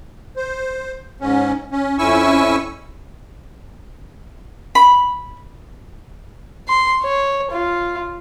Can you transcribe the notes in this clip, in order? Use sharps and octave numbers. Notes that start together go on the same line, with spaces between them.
C5
G#2 C#4
C#4
F2 C#4 E4 G#5 C#6 E6
B5
C6
C#5
F4